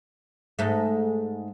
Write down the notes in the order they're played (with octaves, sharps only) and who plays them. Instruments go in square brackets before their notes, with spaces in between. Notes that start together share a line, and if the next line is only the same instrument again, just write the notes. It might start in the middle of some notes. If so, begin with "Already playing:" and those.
[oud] G#2 A3